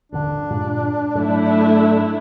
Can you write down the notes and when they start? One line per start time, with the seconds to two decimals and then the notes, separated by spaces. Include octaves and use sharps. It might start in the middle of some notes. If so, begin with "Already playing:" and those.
0.12 D#1 G#1 D3 D4
0.50 G2 A#2 G#3
1.15 G#2 F#3 A3 E4